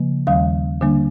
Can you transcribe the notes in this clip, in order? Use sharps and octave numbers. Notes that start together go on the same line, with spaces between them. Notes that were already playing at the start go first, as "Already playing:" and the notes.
Already playing: C#3 F3 A#3
D#2 D#3 G3 F5
D3 G3 A#3 D4